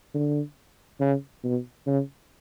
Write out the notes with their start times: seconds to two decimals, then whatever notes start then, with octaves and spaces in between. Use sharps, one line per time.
0.14 D3
1.01 C#3
1.44 B2
1.87 C#3